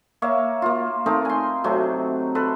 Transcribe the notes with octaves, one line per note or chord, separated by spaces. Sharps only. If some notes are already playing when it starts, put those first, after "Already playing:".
A#3 C#5 E5 F5
A#3 F4
A3 C4 D#4 A#4
G#5 C6
C3 F#3 A3
A4 B4 C6